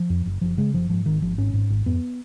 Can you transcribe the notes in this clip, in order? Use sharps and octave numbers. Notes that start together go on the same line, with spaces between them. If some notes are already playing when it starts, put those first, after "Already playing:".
Already playing: F3
F2
F#1
F#1 F3
C#3 G#3
F#1 F3
G#2 F3
G#1 D#3
G#1 F3
G#2 C#4
G#2
G#1
F2 B3